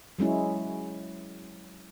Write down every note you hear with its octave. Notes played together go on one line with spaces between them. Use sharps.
F#3 G#3 C#4 E4